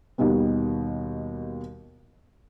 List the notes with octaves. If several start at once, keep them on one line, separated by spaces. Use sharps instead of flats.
D#2 B2 D#3 G3 B3